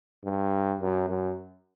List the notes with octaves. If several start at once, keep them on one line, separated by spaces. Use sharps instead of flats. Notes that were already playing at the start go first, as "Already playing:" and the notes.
G2
F#2
F#2